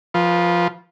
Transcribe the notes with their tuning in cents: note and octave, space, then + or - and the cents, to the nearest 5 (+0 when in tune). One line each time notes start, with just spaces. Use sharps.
F3 +0 F4 +0 B4 -25